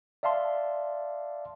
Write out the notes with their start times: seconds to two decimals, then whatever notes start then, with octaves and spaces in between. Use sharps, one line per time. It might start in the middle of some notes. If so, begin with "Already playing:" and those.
0.23 D5 E5 F5 A5 C6